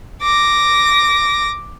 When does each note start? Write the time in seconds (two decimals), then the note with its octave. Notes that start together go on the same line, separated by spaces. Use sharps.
0.23 D6 A#6